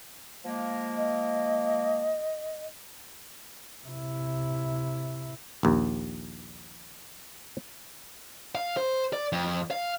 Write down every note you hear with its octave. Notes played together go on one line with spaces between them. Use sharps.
F3 G#3 A#3
D#5
C3 E4
A#1 D#2
F5
C5
D5
F2
F5